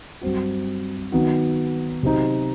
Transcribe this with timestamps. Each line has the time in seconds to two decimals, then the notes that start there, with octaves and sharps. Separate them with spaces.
0.21 G2 F#3 C4 F#4
1.12 D#3 F#3 B3 D#4 F#4
2.03 C3 F#3 C4 D#4